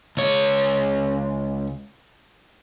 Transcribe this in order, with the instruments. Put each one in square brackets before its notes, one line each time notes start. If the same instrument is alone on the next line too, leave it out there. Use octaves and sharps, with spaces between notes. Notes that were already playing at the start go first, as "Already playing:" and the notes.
[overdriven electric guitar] C#2 C#5